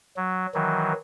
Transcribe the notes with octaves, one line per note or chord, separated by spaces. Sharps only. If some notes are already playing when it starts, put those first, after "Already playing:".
F#3
D#3 E3 F#3